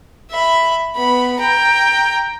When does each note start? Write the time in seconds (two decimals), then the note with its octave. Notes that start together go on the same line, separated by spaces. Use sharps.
0.30 E5 B5
0.96 B3 B5
1.40 G5 A#5